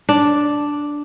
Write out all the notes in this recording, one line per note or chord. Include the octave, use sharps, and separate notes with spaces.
D4